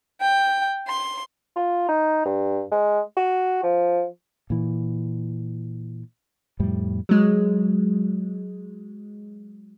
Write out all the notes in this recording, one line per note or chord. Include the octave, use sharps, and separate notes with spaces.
G5
C6
F4
D#4
G2
G#3
F#4
F3
A#2 E3
F2 A2 G3
F#3 G#3